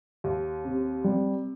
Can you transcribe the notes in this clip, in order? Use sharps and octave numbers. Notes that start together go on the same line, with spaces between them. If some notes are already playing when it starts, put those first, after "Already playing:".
D#2
C3
C3 G3